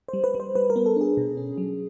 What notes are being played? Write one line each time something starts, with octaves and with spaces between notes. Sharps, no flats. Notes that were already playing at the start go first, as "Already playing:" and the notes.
G3 C5
B4
G3
C5
G3 B4
A#4
B3
A4
D4 G#4
B2
C#4
F#3